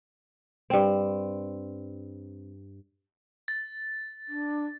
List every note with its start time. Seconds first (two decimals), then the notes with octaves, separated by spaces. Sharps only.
0.70 G2 C4
3.48 A6
4.28 D4